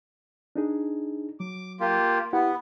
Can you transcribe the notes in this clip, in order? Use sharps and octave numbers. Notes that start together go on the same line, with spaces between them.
D4 D#4 G#4
F#3 D6
A#3 F4 G4
B3 E4 G4 F#5